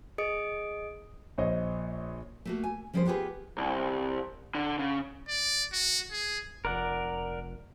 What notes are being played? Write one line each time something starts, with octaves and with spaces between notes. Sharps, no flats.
G#4 D#5 D#6 D7
A#1 C5 C#5 D#5
A3 A#3 F#4
G#5
F3 G3 C#4 G#4 A#4 C5
B3 F4 G4 G#4 B4
C2
D3
C#3
D5
F#4
G#4
F1 A#4 D5 F#5